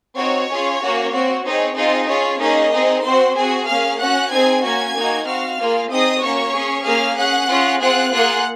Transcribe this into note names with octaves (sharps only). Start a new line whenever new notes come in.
C4 D#4 F#4 C#5
C#4 F4 G#4
A#3 C#4 F#4
C4 F#4
C4 D#4 G#4 C#5
C4 D#4 F4 G#4 D#5
C#4 F4 G#4 C#5
A#3 C#4 D#4 G#4 D#5
C4 D#4 G#4
C4 F#4 C5 C6
C4 F#4 G#4 G#5
A#3 C#4 G#4 F5 F6
C#4 F#4 F#5 F#6
C4 D#4 G#4 G#5 G#6
A#3 C#4 F#4 G#5 G#6
A#3 D#4 F#4
C4 F#4 F5 F6
A#3 F4 G#4
C4 D#4 G#4 D#5 D#6
A#3 C#4 F#4 C#5 C#6
C#4 G#4
A#3 C#4 G#4 F5 F6
C#4 G#4 F#5 F#6
C#4 F4 G#4
C4 F4 G#4 F#5 F#6
A#3 F4 G#4 F#5 F#6